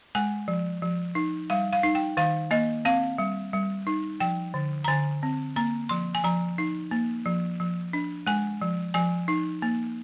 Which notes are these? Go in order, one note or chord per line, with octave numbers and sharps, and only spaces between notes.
G#3 G#5
F3
F3
D#4
G3 F5
F5
D#4
G5
D#3 F5
A#3 D#5
C4 F5
G3
G3
D#4
F3 G5
D3
A#5
D3 G#5
C4
A#3 A#5
F3 C6
G#5
F3 A#5
D#4
A#3
F3
F3
D4
G#3 G#5
F3
F3 G#5
D#4
A#3